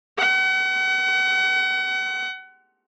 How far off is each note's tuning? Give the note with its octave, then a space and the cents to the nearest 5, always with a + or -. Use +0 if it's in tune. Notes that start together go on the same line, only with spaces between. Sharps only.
F#5 +35